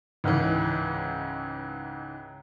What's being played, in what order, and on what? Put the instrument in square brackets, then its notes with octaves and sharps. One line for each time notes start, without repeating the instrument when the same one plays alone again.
[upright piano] C#2 G#2 C#3 E3